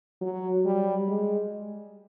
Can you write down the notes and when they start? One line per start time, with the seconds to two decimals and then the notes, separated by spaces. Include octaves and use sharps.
0.21 F#3
0.65 G3
1.08 G#3